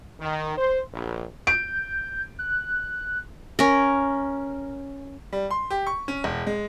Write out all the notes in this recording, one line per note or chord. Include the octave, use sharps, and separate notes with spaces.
D#3
C5
A#1
G6 D7
F#6
C#4 A#4
G3
C6
G4
C#6
C#4
E1
G#3